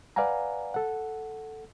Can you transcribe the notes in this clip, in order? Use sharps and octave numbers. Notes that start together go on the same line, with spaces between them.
B4 D5 F5 F#5 G#5 A#5
A4 F#5